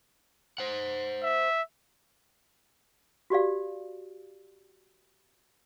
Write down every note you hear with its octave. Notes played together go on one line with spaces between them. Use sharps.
C5 F#5
E5
F#4 G4 D5 F5